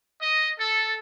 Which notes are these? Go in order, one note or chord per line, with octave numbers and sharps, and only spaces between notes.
D#5
A4